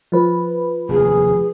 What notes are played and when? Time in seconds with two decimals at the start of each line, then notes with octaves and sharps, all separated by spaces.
0.12 F3 B4
0.89 F1 D#2 G#4